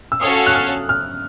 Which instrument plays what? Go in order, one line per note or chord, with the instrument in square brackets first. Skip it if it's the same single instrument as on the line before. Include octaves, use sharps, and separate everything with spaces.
[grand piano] E6
[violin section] C#4 F#4 A4 C#5 F5 [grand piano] D#6
[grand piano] F#6
F6
F6